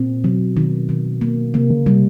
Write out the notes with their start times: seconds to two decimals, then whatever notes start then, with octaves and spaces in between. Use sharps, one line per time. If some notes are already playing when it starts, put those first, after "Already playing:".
Already playing: A#2 C4
0.24 B2 F#3
0.57 D#3
0.89 D#3
1.21 A#3
1.54 C3 A#3
1.70 C#3
1.86 C3 G3